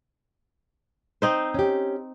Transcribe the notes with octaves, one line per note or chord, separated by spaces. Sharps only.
C4 D#4 C5
C#4 G4